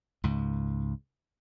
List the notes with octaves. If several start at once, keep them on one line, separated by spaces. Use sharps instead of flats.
C#2 G#2